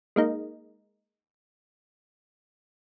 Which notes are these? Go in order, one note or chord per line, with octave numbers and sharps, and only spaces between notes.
G#3 A#3 D#4